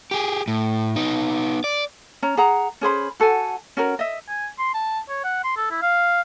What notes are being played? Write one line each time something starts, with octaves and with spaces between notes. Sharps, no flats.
G4 G#4
A2
B3 D#4
D5
C#4 A#5
G#4 F#5 A#5
C#4 G#4 C5 B5
F#4 A4 F#5 G#5
C#4 F#4 A#4
D#5 E5
G#5
C6
A5
C#5
F#5
C6
A4
E4
F5